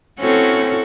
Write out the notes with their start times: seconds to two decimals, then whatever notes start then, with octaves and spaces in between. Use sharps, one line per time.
0.20 C4 C#4 E4 F#4 A4